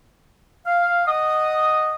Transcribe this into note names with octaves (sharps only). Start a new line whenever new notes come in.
F5
D#5 F#5 D#6